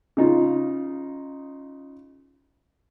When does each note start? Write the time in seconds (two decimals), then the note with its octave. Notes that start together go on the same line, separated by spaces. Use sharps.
0.17 C#3 D#4 F4